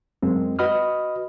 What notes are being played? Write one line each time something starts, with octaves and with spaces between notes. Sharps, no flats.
F#2 G#3 C4
F#4 B4 D#5 B5 D#6 F6